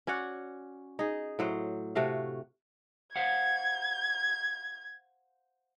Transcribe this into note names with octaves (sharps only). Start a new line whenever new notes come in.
C#4 F#4 D5 F#5
D#4 G#4
A2 F#3 C5
C3 A3 F#4 F5
C5 F5 F#5 G#6